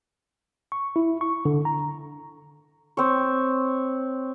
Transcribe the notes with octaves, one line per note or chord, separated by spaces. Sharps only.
C#6
E4
C#6
D3
A#5
C4 C#5